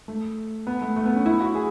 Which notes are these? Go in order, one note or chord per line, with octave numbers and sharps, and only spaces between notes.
A3
B3
A3
A3
B3
C#4
E4
F#4
G#4